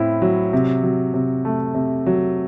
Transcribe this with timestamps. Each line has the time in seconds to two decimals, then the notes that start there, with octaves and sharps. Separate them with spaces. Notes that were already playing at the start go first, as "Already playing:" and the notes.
Already playing: A2 C4 E4
0.22 F#3
0.53 C3
0.83 F#3
1.14 C3
1.45 A3
1.75 C3
2.06 F#3